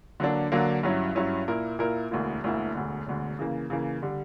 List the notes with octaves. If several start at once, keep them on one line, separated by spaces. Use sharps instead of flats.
D3 F#3 A#3 D4
D3 F#3 A#3 D4
G2 F#3 C#4 E4
G2 F#3 C#4 E4
A#2 A#3 E4 A#4
A#2 A#3 E4 A#4
E1 D2 D3 A#3 E4
E1 D2 D3 A#3 E4
E1 D2 D3
E1 D2 D3
C#3 E3 A#3
C#3 E3 A#3
D3 G3